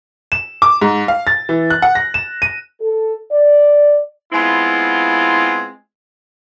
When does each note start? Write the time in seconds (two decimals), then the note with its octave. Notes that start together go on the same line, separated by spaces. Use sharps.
0.32 E7
0.62 D6
0.82 G#2
1.08 F5
1.27 A6
1.49 E3
1.70 F#6
1.82 F#5
1.95 A#6
2.14 E7
2.42 D#7
2.81 A4
3.32 D5
4.33 G#3 B3 C4 E4 F4